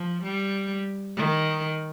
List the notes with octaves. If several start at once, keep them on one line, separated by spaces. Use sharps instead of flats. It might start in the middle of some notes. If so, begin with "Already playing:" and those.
Already playing: F3
G3
D#3